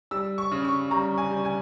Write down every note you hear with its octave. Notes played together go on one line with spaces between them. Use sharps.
G3 E6
C#6
C#3
C#6
G3 A#5
G#5
G3
G#5